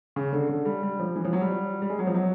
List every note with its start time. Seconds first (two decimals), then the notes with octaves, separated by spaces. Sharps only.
0.16 C#3
0.33 D3
0.49 D3
0.65 G3
0.83 G3
0.99 F3
1.16 E3
1.25 F3
1.33 F#3
1.41 G3
1.82 G3
1.90 G#3
1.99 F#3
2.07 F3
2.14 F#3